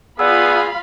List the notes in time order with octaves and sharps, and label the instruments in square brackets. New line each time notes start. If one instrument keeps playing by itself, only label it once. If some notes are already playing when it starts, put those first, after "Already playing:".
[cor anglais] B3 [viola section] F4 F5 B5 [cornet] G#4 [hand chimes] D5 F#5 E6